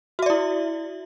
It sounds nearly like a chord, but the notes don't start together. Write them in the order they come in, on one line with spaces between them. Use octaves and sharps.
F#4 E5 D5 E4